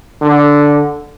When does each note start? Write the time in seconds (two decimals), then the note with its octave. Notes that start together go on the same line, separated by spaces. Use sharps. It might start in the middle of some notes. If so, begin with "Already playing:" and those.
0.22 D3